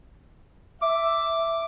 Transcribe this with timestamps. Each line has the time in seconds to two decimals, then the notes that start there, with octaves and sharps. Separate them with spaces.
0.82 E5 D6